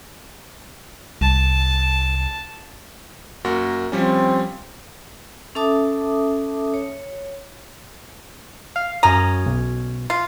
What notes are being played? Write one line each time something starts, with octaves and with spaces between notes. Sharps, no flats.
C2 A5
F#2 A#3 F#4
F3 G3 C4 C#4
C#4 A4 E5 A5 D6 D#6
C#5
F5
F#2 C#4 A#5 D#6
B1
F4